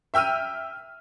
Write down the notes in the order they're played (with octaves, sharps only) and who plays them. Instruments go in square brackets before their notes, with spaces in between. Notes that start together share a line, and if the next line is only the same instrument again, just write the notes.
[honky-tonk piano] E5 G5 E6 F6 D#7